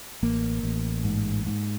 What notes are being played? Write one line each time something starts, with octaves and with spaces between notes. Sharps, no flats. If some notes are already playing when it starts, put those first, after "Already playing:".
A1 A#3
A1
G#2
G#2